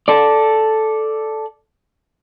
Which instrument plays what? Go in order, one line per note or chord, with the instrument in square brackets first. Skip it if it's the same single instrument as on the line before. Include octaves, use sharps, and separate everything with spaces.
[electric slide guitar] A4 D5